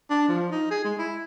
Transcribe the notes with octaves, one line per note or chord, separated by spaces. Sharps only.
D4
F3
D#4
G#4
G#3
E4